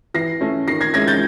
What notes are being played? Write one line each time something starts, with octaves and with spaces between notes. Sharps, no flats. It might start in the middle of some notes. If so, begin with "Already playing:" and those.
E3 A#6 C7
A3 C#4
D#3 A#6 C7
G#6 A#6
G#3 C#4 E4 G#6 A#6
G6 A6